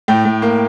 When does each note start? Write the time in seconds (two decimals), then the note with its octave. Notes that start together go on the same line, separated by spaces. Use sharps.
0.08 A2 G5
0.25 A2
0.42 A#3